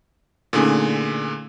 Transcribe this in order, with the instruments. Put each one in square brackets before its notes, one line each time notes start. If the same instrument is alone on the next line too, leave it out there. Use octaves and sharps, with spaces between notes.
[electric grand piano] A#2 D3 G#4 [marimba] A3 C#4 D#4